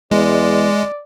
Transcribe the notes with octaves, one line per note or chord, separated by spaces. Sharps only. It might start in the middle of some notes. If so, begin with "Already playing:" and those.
E2 G#3 D5